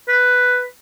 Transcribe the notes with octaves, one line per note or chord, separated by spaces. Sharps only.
B4